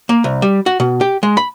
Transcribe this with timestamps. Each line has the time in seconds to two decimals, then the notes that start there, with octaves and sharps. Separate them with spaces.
0.09 A#3
0.24 C2
0.42 G3
0.66 F#4
0.80 B2
1.01 G4
1.23 G#3
1.37 B5